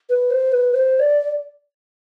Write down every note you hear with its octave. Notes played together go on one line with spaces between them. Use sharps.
B4
C5
B4
C5
D5